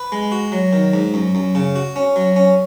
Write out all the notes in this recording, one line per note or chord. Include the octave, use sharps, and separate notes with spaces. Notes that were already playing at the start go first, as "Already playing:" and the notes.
Already playing: B4
G#3
F#4
F#3
D#3
G#2
F#2
F#2
C#3
F#4
C#4
F#3
C#4